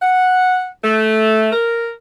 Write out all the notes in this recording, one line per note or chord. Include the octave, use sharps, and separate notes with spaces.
F#5
A3
A#4